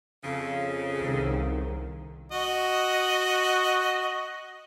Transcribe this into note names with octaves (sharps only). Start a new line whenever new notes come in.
F2 C#3
C2 D#3
F#4 D#5